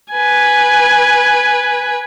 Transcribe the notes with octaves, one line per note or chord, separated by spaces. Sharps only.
B4 G#5